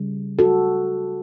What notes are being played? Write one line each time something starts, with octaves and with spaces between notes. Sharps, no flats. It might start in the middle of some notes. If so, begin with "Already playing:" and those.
Already playing: C#3 G3
F#4 A4